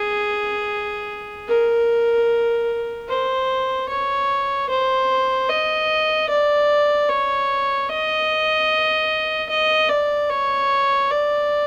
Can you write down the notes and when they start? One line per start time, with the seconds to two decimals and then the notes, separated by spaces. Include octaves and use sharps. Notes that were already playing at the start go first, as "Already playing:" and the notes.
Already playing: G#4
1.48 A#4
3.08 C5
3.89 C#5
4.69 C5
5.49 D#5
6.29 D5
7.09 C#5
7.89 D#5
9.49 D#5
9.89 D5
10.29 C#5
11.10 D5